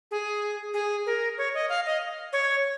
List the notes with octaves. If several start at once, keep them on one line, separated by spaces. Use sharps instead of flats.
G#4
G#4
A#4
C#5
D#5
F5
D#5
C#5